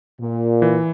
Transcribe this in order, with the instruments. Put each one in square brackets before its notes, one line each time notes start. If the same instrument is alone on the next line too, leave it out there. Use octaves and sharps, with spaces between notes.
[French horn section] A#2
[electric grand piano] E3